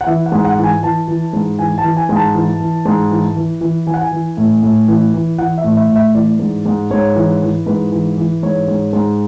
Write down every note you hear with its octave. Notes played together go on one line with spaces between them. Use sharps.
F#5
E3 E5
F#5
G#2
F#5
E3
G#5
E3 A5
E3
G#2
E3 G#5
A5
E3
G#5
G#2
A5
E3
E3
G#2
E3
E3
E3
E3 G#5
F#5
G#5
E3
A2
A2
E3
E3
E3 F#5
E5
A2
E5
A2
E5
E3 D5
G#2
G#2
G#2 C#5
E3
E3
G#2 B4
E3
E3
G#2 C#5
G#2
G#2